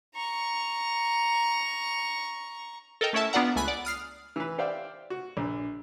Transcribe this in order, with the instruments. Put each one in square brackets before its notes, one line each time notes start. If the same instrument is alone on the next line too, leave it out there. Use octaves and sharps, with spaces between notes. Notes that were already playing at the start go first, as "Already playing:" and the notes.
[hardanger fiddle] A#5 C#6
[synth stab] A4 A#4 D#5 G5
A3 C#4 E4 E5 A5
B3 D4 F4 D5 F#5 A#5
C#2 A3 G#5 B5 F#6
D5 F#5
D#6 F6 C7
[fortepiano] E3 B4
G4 C5 D5 E5 F5 G5
F#4
A#1